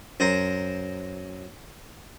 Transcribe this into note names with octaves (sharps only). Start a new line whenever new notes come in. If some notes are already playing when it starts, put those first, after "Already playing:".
F#2 C5 A#5